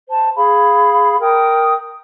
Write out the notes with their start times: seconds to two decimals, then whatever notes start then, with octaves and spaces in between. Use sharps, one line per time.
0.09 C5 A5
0.35 G#4 F5 B5
1.20 A#4 G5 D#6